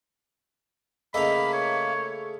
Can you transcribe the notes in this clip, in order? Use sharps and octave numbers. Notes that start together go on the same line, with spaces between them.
C#3 A3 A#3 A4 D#5 A#5 B5
C#5